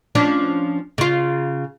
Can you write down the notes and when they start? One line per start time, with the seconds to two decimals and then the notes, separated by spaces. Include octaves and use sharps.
0.15 F3 C#4 D4
0.98 C#3 F4